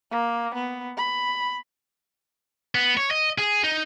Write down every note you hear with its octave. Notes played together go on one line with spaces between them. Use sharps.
A#3
B3
B5
B3
C#5
D#5
G#4
D#4